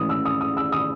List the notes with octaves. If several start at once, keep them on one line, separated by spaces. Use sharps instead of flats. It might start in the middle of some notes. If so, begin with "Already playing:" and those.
Already playing: A2 E3 G#3 C#4 D#6
E6
D#6
D#6
E6
D#6